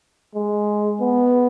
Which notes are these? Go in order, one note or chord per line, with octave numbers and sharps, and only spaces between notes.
G#3
B3